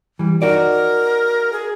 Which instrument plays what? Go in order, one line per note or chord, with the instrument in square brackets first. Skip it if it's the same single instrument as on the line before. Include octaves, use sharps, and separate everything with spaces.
[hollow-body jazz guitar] E3 G3
[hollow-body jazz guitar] D#4 F#4 D5 [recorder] A#4
[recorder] G#4